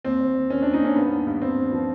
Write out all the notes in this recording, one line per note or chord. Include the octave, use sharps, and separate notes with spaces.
D#2 C4
D#2
D#2
D#3 C#4
D4
D#2
D#4
D#2 C#4
G2 B3
G2
G2
G2 C4
G2
F3